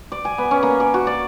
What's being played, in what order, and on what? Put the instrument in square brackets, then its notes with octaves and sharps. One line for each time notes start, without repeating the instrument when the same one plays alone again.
[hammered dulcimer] D5
G#5
B3
C#4
A#3
D5
F#4
D5